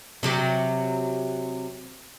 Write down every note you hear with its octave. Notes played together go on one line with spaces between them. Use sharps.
C3 F#3 G4